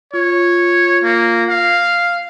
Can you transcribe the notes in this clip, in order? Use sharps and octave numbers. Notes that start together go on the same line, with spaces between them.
F4 C#5
A#3
F5